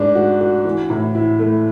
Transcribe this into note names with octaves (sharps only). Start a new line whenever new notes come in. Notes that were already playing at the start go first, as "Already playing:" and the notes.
Already playing: G#2 D4
F#4
F#4
E3
A2
E4
A3